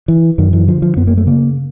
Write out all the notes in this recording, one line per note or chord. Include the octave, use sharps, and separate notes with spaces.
E3
F#2 D#3
E3
D3 F3
F3
F#2 B3
A#3
A3
C#3 A#3